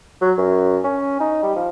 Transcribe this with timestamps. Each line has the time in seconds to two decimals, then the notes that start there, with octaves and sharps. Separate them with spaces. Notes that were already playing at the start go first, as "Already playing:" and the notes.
0.21 F#3
0.38 F#2
0.85 C#4
1.20 D#4
1.43 G3
1.56 F3